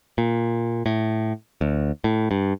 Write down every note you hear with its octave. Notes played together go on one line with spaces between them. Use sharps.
A#2
A2
D2
A2
G2